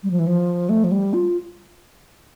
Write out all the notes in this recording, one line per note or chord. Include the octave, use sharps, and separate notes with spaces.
G3
F3
E3
F3
A3
F3
G3
F4